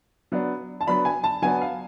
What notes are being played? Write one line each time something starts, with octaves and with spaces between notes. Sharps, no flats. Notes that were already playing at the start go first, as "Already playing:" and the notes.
F#3 B3 D4
A5
F#3 B3 D4 B5
G#5
A5
F#3 B3 D4 G#5
F5